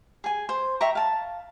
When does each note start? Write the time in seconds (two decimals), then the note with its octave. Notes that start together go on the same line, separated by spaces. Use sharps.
0.24 G#4 G#5
0.49 C5
0.80 E5 G5 A#5 C#6
0.95 F5 A5